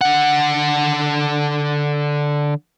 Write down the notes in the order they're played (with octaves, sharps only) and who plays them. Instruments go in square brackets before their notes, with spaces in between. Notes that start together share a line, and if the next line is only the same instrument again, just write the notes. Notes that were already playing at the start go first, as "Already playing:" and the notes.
[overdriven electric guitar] D3 F#5